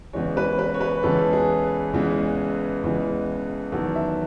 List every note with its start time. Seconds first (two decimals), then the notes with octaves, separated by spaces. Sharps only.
0.13 E2 C#3 E3 G#3 C#5
0.37 B4
0.59 B4
0.74 C#5
0.81 B4
1.03 E2 C#3 E3 G#3 A4
1.33 G#4
1.93 E2 C#3 E3 G#3
2.83 E2 C#3 E3 G#3
3.72 E2 D#3 F#3 A4
3.95 E5